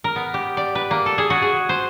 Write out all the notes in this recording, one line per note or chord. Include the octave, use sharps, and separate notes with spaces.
A#4
B3
G4
D5
B4
A#3
A4
G#4
F#4
G#4
C5